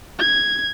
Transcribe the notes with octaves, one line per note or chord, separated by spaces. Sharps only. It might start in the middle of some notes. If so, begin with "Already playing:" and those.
G#6